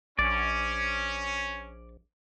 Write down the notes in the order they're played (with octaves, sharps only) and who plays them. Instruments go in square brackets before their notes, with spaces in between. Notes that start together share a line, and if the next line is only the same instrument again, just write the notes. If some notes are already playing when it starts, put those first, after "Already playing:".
[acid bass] A#1 [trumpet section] C#4 [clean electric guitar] D5